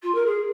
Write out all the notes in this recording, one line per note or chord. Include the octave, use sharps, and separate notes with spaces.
F4
A#4
G#4